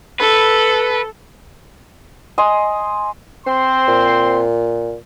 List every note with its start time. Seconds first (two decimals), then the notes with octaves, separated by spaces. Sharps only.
0.20 A4 B4
2.38 D#5 G#5 C6
3.46 C4 C5 C6
3.88 A#2